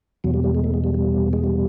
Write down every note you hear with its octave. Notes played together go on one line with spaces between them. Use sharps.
E2 B2 F#3
G3
G3
G#3
A3
G#3
G3
G3
G#3
G3